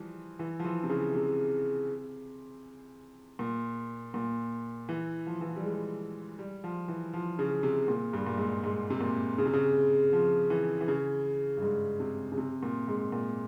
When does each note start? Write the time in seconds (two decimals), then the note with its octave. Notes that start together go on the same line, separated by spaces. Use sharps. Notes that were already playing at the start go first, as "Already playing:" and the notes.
Already playing: E3 F3 G3
0.39 E3
0.59 F3
0.65 E3
0.84 C3
0.89 C#3
1.15 C3
3.39 A#2
4.14 A#2
4.89 E3
5.27 F3
5.41 E3
5.48 F3
5.56 G3
5.64 G#3
6.39 G3
6.64 F3
6.88 E3
7.13 F3
7.39 C#3
7.63 C3
7.88 A#2
8.13 G2
8.26 A#2
8.38 G#2
8.64 G#2
8.90 C3
9.01 A#2
9.38 C#3
9.46 C3
9.53 C#3
10.13 F3
10.50 E3
10.81 E3
10.88 C#3
11.57 G2
11.62 G#2
12.00 C3
12.32 C#3
12.38 C3
12.63 A#2
12.88 G#2
13.12 A#2